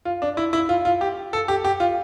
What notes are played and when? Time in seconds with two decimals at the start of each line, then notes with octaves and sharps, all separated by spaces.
0.05 F4
0.22 D4
0.37 E4
0.53 E4
0.69 F4
0.85 F4
1.01 G4
1.33 A4
1.48 G4
1.64 G4
1.80 F4